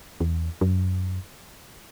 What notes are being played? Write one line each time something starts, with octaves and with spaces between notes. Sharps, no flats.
E2
F#2